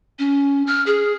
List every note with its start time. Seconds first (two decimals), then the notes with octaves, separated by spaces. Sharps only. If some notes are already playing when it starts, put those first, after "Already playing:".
0.19 C#4
0.67 F6
0.86 G#4